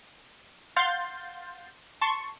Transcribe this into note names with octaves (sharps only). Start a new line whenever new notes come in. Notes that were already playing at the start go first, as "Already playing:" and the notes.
F5 F#5 C6 G6 A6
A5 C6 C#6